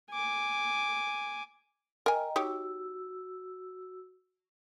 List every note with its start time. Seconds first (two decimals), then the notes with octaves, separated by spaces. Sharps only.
0.10 G#5 D6
2.06 A#4 D#5 G5 G#5 A#5
2.36 D#4 F#4 G4 C#5 E6